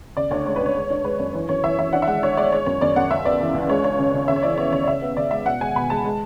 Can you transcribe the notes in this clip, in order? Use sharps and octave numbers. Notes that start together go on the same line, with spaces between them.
C#3 D5
D2 C#5
G#3 C#5
D2 B4
C#5
G#3
D4
G#3 B4
F#2
E3 C#5
F#2 C#5
E3 E5
E3 E5
D4 F#5
E5
G#3 F#5
D4 C#5
G#3 D5
G#3 C#5
F#2 C#5
F#2 D5
F#2 F#5
C#2 E5
B3 D5
E3
C#2
G#3 C#5
D4 C#5
C#3
C#3
C#3 E5
C#5
E3 D5
B3 C#5
C#3 C#5
D5
C#3 E5
B3
C#3 D5
G#3 E5
B2 F#5
G#3 G#5
B2 B5
G#3 A5
G#3